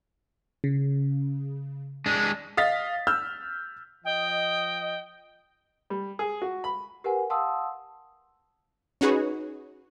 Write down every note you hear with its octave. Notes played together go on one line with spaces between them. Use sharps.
C#3
G#3 D4
D#5 F5 A6 B6
E6 F6 G6
F3 D#5 G5
G3
G#4
F#4
B5
G4 A#4 B4 F#5 G#5
F5 F#5 A5 C6 D#6 E6
C#4 D#4 F#4 G#4 B4 C#5